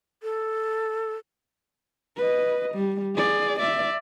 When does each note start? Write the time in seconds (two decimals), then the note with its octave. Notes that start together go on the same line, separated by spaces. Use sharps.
0.23 A4
2.17 B4 D#5
2.74 G3
3.15 G#4 D5
3.59 D5 E5